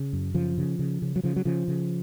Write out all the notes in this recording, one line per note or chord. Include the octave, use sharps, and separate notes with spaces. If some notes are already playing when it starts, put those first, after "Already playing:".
Already playing: C#3
F#2
C#3 F3
C#3
C#3
C#3
F#3
C#3 F3
F#3
C#3 F3
C#3